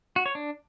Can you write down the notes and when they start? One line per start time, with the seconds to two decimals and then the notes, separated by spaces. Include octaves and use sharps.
0.16 F#4
0.26 C#5
0.35 D4